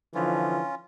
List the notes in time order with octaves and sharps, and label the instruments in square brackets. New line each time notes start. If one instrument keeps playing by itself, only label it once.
[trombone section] D3 E3 F3 [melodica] C#4 F4